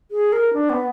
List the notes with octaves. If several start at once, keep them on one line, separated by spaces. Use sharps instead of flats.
G#4
A#4
D4
B3